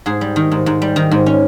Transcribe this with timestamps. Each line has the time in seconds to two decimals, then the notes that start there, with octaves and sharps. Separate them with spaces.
0.06 G#2 G#4
0.21 G3
0.36 D#3
0.51 G#2
0.66 G#2
0.82 G3
0.96 D#3
1.11 G#2
1.26 C#4